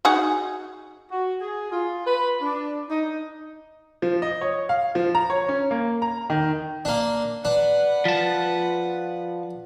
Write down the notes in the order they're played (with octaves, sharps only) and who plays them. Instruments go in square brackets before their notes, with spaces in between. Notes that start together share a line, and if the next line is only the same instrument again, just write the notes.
[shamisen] D#4 F#4 G#4
[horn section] F#4
G#4
F4
B4
D4
D#4
[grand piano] F3
D#5
C#5
F5
F3
A#5
C#5
C#4
A#3
A#5
D#3
[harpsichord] A#3 D4
[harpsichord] D4 [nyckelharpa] B4 F#5
[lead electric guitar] F3 A5